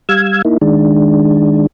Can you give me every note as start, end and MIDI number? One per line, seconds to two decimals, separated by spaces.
0.09 0.42 55
0.09 0.42 77
0.09 0.42 88
0.09 0.42 92
0.45 0.57 58
0.45 0.57 63
0.45 0.57 64
0.61 1.67 51
0.61 1.67 56
0.61 1.67 62